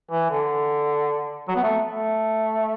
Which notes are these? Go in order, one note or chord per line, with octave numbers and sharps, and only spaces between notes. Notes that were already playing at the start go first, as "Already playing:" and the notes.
E3
D3
F#3
B3
A3
A3